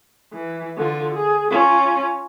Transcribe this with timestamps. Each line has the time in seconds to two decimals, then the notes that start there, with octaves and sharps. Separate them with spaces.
0.33 E3
0.77 D3 F4
1.14 G#4
1.50 C#4 F4